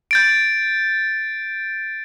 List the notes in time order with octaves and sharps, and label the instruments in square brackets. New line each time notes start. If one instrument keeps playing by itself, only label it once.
[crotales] G6 A6 D7